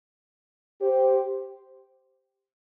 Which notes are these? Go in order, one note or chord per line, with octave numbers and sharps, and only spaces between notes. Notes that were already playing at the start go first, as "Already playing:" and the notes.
G4 C5